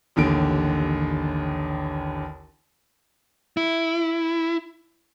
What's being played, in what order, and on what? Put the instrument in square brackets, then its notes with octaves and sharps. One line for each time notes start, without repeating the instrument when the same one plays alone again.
[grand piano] A1 D#2 D3 D7
[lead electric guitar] E4